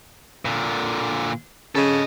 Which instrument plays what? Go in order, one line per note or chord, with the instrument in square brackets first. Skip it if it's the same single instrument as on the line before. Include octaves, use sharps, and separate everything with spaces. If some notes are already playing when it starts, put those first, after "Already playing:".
[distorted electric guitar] A#2 D3
[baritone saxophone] C#3 [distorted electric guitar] A4 D#5